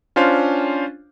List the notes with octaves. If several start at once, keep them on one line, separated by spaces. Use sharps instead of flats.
C#4 D4 F4 C5 F5